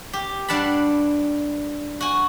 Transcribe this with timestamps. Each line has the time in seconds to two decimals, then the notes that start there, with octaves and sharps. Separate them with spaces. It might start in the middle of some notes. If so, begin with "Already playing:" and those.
0.13 G4
0.48 G2 D4 F#5 A5 B5
2.01 F#4 G#5